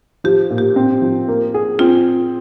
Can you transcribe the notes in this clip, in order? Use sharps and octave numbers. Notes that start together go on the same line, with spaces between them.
F3 G4
A#2
G4
C4
F3
A#3
G#4
C4 F4